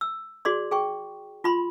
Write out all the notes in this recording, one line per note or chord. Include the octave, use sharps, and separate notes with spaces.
E6
F#4 G#4 D5 C6
G#4 G5 C#6
F4 B5 C6